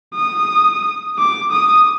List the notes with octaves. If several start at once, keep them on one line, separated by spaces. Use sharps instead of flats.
D#6
D6
D#6